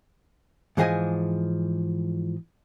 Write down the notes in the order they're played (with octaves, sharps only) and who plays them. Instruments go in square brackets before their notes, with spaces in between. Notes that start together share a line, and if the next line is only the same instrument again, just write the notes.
[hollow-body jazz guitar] G#2 E3 F3 G#4 D#5 G#5